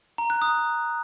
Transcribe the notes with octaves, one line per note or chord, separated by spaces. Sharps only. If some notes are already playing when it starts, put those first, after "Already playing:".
A#5
F#6
D#6